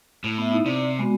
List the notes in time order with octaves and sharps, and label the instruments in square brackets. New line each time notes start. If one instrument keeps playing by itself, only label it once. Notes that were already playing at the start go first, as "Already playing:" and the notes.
[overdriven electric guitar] A2
[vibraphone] B3 E5
D#4 E4
[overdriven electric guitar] C3 [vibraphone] D5
[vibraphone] G#3 B3 F#4